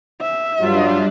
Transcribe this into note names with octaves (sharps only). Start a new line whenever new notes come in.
E5
G2 F#3 G3 D4 F4